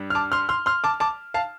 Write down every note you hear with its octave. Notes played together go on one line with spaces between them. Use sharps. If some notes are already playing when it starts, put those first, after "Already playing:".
Already playing: G2 G3
F6
A5 D6
C6 F6
C6 F6
C6 F6
A5 D6
A5 D6
F5 A5